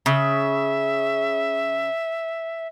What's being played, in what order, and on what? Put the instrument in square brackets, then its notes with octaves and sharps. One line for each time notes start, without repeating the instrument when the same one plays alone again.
[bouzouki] C#3 [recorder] E5